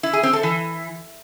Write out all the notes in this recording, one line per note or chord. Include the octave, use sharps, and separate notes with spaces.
E4
G#4
C4
A4
E3